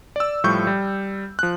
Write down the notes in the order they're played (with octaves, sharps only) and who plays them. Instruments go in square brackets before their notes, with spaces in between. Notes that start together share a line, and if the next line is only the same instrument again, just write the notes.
[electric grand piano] D5 E6
A2 F3 G3 C#6 G6
G3
F3 F#6